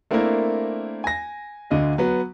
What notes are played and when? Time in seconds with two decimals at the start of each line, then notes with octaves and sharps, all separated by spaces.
0.11 A3 A#3 C4 D4 E4 A#4
1.04 G#5 A#6
1.71 D2 D3 D#5 F5
1.98 F#3 B3